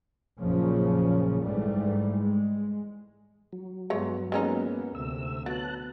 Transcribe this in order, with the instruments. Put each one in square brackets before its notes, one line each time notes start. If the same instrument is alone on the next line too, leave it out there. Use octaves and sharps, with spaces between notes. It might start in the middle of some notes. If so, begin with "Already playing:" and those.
[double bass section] A#1 F#2 A#2 C#3 F3 C#4
G#2 E3 G3 A3
G#3
[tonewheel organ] F#3
[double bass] G2 B3 [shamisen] G#3 C#5
[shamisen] G#3 C#4 D#4 [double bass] A#3 B3
[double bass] D2 C3 [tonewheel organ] E6
[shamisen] F#3 [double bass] B3 [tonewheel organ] A5 F#6